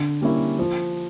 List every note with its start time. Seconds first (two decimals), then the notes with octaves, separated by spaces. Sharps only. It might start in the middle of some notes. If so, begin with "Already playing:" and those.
Already playing: D3
0.21 G3 A#3 C#4 E4
0.59 F3